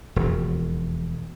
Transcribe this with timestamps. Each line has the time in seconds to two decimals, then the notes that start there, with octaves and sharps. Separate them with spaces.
0.16 E1 F2